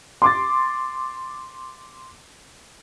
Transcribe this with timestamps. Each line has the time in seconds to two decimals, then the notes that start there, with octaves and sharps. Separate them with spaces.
0.22 C6 D6 A6